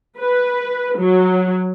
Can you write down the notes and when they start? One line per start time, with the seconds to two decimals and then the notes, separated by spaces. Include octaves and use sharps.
0.19 B4
0.98 F#3